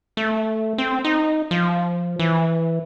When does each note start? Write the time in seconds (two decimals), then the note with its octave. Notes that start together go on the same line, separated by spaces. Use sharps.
0.17 A3
0.78 C4
1.04 D#4
1.51 F3
2.19 E3